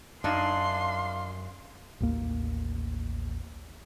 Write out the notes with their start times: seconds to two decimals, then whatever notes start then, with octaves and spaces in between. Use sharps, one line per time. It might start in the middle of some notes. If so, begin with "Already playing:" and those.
0.24 F#2 D4 D#4 F5 C6
2.00 A1 D#2 A#3